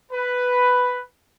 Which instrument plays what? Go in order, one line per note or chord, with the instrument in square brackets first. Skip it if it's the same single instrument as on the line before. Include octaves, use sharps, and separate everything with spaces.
[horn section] B4